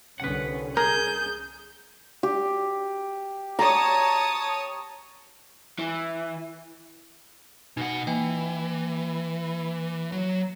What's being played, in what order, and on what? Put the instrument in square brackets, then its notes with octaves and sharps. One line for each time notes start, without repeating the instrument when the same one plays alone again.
[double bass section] C2 D3 C#4 [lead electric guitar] B4 F#5
[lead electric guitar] G#4 [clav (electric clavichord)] A#4 [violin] G6
[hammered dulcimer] G4
[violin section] C#5 A5 D#6 [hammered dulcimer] A#5
[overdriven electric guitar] E3
[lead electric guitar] B2 F#5 [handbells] D#4
[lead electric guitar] E3 [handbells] A#3 G5 G#5
[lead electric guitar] F#3